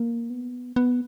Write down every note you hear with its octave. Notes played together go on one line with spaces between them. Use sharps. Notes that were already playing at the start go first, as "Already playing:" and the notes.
Already playing: A#3
B3
B3